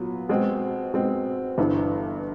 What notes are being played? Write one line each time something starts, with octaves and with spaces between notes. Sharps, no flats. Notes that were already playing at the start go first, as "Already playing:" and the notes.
Already playing: A#2 F#3 B3
B2 G#3 C4
B2 G#3 C4
G1 G2 E3